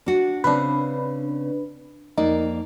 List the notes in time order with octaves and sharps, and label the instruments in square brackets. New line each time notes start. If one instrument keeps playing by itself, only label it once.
[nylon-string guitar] D4 F#4
[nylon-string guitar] C#3 C4 [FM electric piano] D4 B4
[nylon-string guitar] F2 A#3 D5 [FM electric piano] D#4